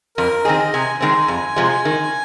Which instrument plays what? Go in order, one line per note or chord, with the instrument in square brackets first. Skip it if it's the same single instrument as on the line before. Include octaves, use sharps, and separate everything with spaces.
[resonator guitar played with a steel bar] F2 [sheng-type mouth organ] A#4
[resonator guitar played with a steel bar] D#3 C4 G#4 [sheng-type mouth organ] D#5
[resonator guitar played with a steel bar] C3 [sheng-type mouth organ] G#5
[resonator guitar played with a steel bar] D#3 G#3 C4 [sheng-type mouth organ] G#5
[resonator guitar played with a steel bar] F2
C3 F3 G#3
D#3